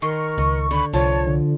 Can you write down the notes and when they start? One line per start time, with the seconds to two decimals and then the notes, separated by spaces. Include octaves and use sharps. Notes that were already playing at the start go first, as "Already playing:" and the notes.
0.02 D#3 A#4 D#5 C6 C#6
0.38 C#2 D#5
0.71 D3 B5
0.93 C2 F3 C#5 A5
1.27 D3